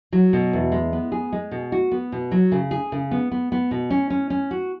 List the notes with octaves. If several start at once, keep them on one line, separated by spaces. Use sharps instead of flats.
F#3
B2
E2
G#3
B3
G#4
G#3
B2
F#4
B3
B2
F#3
C#3
G#4
C#3
B3
B3
B3
B2
C#4
C#4
C#4
F#4